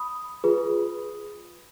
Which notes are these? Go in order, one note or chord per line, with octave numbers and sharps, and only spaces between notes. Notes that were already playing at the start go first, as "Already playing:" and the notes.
Already playing: B5 D#6
F4 G#4 B4